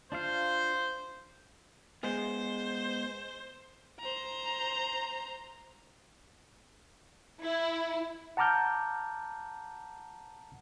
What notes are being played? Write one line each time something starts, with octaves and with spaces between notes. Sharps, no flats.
D4 F4 C5 F5
G#3 B3 G#4 C5
C5 A#5
E4
F#5 A5 A#5 D6 F6 G6